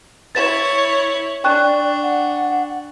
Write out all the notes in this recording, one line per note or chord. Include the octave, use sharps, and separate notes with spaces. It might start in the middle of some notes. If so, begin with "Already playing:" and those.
E4 C#5 A6 E7
D4 D5 G5 C#6 F#6
F#5